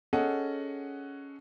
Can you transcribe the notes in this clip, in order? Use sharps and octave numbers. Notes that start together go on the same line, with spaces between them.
C#4 G#4 A4 D#5 F#5